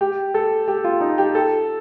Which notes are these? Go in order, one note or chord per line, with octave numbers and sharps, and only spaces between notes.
G4
A4
G4
F4
D#4
G4
A4